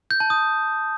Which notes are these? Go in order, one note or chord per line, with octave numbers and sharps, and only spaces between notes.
G6
A5
D#6